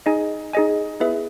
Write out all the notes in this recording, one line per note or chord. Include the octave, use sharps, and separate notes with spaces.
D#4 G#4 D#5 G#5
D#4 G#4 D#5 G#5
B3 E4 G#4 B4 E5